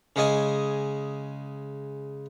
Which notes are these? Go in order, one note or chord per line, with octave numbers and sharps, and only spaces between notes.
C#3 G#3 D#5 G#5